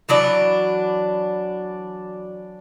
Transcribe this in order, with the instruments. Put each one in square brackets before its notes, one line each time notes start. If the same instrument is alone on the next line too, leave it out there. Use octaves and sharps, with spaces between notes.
[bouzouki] E3 F#3 D4 D5